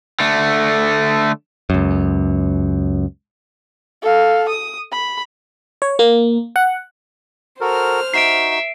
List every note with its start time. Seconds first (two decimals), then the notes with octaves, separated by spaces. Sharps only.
0.20 D3 A3
1.70 C#2 F#2
4.02 A4 F5
4.49 D#6
4.92 B5
5.82 C#5
5.99 A#3
6.56 F#5
7.61 F#4 A4 A#4 C5 F6
8.14 D#4 F#4 E5 C7 D7